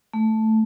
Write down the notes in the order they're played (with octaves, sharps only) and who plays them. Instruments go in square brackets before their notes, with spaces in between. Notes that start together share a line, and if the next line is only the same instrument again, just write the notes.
[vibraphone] A3